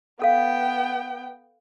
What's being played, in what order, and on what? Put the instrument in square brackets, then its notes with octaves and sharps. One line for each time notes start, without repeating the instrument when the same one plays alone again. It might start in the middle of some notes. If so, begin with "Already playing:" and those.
[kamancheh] B3 G5 [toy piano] A4 F5